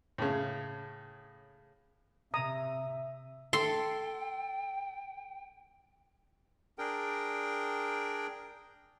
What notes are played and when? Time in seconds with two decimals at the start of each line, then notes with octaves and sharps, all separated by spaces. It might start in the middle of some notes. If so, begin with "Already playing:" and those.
0.18 A2 C#3
2.34 C3 E5 A#5 D#6
3.53 A4 G5 C6
6.79 D4 G#4 A#4 G5